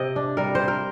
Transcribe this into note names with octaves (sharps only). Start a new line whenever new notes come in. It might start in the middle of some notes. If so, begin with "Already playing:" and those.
Already playing: C3 D#5
D4
G3 A#4
C3 C5
A#4